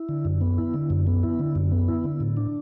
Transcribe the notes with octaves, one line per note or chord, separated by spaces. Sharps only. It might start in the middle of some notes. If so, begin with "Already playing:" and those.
Already playing: E4
D3
F#2
B3
E4
D3
F#2
B3
E4
D3
F#2
B3
E4
D3
A2
D4